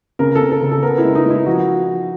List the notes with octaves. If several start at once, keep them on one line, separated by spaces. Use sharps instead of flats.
C#3 A#4
C#3 A4
A4
C#3
A4
B3 A#4
E4
G#3
D#4
G#3
E4
F3 F#4